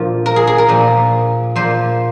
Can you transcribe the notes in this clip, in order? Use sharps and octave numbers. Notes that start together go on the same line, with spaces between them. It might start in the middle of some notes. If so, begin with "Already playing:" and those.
Already playing: A#2 F3 F4
A#4
G#4
G#4
A#4
A#2 F3
A#2 F3 C5